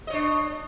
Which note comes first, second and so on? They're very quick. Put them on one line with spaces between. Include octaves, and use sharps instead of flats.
D#5 C#5 D4